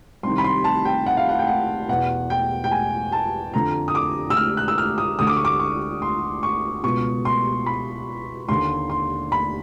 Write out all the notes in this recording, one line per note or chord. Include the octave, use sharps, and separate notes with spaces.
C2 C3 D#3 C6
B5
C6
A5
G5
F#5
F5
F#5
G5
F#5
E2 B2 F#5
G5
G5
G#5
A5
F2 D3 A#5
D#6
D6
E6
F6
F#6
E6
F6
D#6
D2 D3 D#6
D6
C#6
D6
C#6
C6
C#6
C#2 B2 C#6
C6
B5
D#2 D3 C6
C6
B5